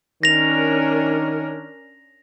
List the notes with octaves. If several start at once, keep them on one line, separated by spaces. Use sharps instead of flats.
D#3 C#4 D4 A#4 A#6 F7